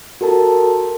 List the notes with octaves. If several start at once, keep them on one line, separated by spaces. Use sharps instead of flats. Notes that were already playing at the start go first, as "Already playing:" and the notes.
F#4 A4 A#4 A5